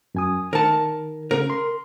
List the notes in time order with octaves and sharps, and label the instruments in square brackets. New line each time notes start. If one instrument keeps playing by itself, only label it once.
[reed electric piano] F#2 G#5 D#6
[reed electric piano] D#3 [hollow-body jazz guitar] A#4 A5
[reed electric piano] C#3 [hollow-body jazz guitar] A#4
[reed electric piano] C6